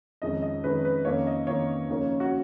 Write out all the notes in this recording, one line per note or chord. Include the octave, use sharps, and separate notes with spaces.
F2 D#3 G#3 C#4 D#5
D#5
F2 D#3 G#3 C#4 B4
B4
F2 D#3 A#3 C#4 C#5
D#5
F2 D#3 A#3 C#4 C#5
D#2 C#3 F3 A#3 C#4
F#4